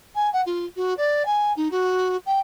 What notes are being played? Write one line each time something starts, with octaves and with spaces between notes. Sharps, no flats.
G#5
F#5
F4
F#4
D5
G#5
D#4
F#4
G5